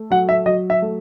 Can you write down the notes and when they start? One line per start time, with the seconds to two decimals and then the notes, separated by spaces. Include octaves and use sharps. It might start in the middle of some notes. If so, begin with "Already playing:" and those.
Already playing: A3
0.10 F#3 F#5
0.29 E5
0.46 F#3 D#5
0.70 E5
0.82 A3